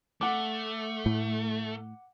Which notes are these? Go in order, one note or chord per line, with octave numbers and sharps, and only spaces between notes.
A3 F#5 D6
A2